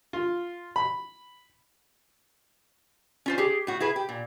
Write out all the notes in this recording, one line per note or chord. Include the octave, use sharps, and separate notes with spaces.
F4
B5
C#4 F4 C5
G4 G#4
A2 F#4
E4 G#4 B4
G4
A#2